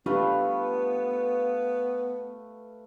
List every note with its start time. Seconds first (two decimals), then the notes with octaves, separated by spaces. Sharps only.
0.06 A3 B3 D4 F4 G4 B4 F5